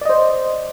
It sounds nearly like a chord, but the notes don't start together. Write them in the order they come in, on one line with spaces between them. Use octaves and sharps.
D5 D#5 C5